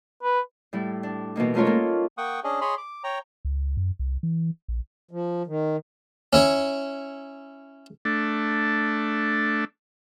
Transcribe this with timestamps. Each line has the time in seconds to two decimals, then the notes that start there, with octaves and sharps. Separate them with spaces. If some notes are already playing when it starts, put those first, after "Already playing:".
0.23 B4
0.73 A2 G3 E4
1.03 D4
1.36 B2 E3 A#3 D#4
1.54 G#3 A3 C#4 F4 A#4 C#5
1.65 A#3 A4
2.18 A#3 F#5 G5 C#6 D#6
2.44 C#4 D4 G#4 D#5
2.61 G#4 C#5 D#5 B5 C6
2.78 D6
3.04 C#5 G5 A#5
3.45 C#2
3.77 F#2
3.99 C2
4.23 E3
4.68 A#1
5.11 F3
5.47 D#3
6.33 C#4 E4 C#5
8.05 A3 D4